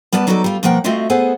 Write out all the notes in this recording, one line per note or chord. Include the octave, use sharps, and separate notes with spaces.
G3 B3 B4 D5 A5
F#3 D#4 F#4 A4 B4 D5
G3 F4
B2 F3 A#3 F#5 G5
A3 C4 F4 F#4 D#5 E5
B3 G#4 A4 C5 F#5 G#5